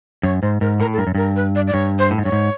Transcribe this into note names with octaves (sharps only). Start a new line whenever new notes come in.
F#2 C#5
G#2 C5
G#2 A#4
A2 A#4
A4
G2 A#4
F#2
G2 A#4
B4
D5
D5
G2 C#5
C5
A2
G#2
G2 C#5
G#2